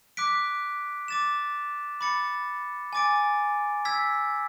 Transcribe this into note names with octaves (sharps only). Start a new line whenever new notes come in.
D6 F#6 B6 D7
D6 A6 E7
B5 D6 A6 C#7
G#5 D6 A6 D7
E6 G#6 B6